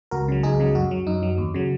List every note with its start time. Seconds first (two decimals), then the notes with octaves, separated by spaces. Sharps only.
0.11 C#2 F#4 A#4
0.28 C#3 F#3
0.43 C#2 D#4 G#4
0.60 C#3 F#3
0.75 F#2 F#4
0.91 F#3
1.07 F#2 D#4
1.23 F#3
1.38 D#2
1.54 C#3 F#3